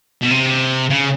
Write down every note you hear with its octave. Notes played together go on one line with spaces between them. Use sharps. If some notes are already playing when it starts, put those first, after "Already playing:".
B2
C3
C#3